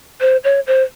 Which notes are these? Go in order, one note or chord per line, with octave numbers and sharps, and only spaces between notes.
C5
C#5
C5